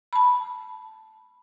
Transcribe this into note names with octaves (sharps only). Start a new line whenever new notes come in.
A5 B5